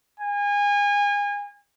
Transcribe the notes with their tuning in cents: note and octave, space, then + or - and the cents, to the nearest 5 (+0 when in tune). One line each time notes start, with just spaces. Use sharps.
G#5 -30